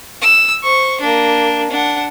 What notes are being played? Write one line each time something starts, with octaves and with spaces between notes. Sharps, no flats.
E6
C5 C#6
A#3 D4
D4 F#5